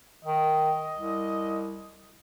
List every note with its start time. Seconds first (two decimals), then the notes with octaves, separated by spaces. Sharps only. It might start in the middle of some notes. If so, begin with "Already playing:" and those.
0.25 D#3 D#5
0.94 C2